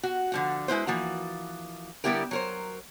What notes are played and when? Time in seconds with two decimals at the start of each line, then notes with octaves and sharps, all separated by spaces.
0.03 F#4
0.32 D3 F3 F#5
0.68 G#3 E4 B4 C5
0.87 E3 F3 A#3 F#4
2.04 D3 G3 B3 E4 G4 A#4
2.31 F#3 A#4 C5